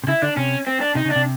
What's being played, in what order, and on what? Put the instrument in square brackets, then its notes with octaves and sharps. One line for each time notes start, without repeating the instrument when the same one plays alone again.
[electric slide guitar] C3
[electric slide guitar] C#3 [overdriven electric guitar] E4
[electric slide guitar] D3 [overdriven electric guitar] D4
[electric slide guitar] C3 [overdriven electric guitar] C#4
[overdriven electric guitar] C4
D4
[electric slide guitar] C3 [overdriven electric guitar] D#4
[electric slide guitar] C#3
[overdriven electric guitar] D4
[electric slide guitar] C3